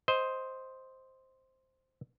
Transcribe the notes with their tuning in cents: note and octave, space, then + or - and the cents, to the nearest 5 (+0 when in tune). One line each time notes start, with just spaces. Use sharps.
C5 +0 D#5 +15